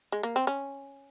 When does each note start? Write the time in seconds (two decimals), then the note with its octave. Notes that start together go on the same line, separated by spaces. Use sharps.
0.12 G#3
0.23 A#3
0.36 C4
0.47 C#4